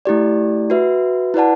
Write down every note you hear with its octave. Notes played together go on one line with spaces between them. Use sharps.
A3 E4 G4 D5
F#4 B4 E5
E4 B4 D5 F#5 A5